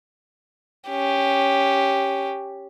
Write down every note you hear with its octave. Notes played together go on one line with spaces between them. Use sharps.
C#4 G4